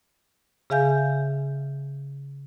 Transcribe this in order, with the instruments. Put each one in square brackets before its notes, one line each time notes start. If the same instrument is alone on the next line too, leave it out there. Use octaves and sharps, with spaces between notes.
[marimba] C#3 G#4 E5 F5 G#5 G6